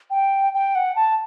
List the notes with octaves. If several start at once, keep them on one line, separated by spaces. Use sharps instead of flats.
G5
G5
F#5
A5